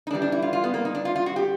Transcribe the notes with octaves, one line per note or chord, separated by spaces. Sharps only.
D#4
A2 E3 G3 D4
D4
E4
F4
F4
B3
A#3
D#4
D4
F4
F4
F#4
G4